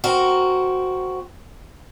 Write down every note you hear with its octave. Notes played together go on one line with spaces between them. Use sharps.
C4 F#4 A#4